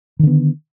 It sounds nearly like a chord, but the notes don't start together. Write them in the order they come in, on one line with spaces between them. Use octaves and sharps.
D#3 D3 B3